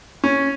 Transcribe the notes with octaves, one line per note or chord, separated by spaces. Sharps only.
C#4